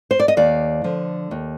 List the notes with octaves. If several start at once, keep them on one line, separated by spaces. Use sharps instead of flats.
C5
D5
D#5
D#2 D5 F5
D3 F3
D#2